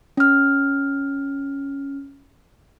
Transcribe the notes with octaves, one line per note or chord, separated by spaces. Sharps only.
C#4 F6